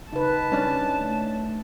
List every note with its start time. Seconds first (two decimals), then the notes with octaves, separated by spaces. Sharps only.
0.13 C#3 D#4 B4 A5
0.52 C#4 D4
1.00 A3